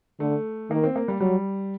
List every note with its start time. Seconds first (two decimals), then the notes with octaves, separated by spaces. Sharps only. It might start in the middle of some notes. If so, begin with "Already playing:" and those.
0.20 D3 A3
0.70 D#3 A#3
0.84 C4
0.96 A#3
1.08 G3
1.20 F#3 G3